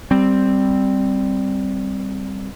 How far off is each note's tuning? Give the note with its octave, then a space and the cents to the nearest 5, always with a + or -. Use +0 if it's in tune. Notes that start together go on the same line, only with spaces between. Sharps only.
G3 +0 C4 +0